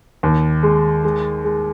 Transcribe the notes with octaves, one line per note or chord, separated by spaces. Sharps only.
D#2
G#3
G#3
G#3